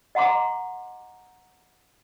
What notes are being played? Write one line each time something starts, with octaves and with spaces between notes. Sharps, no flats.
D#5 F#5 A#5 C6 D6